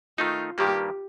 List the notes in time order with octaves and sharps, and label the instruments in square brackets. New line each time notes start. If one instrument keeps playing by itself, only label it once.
[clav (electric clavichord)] D#3 A3 D#4 [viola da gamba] F4
[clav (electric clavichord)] G2 D#3 G3 A#3 [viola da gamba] G4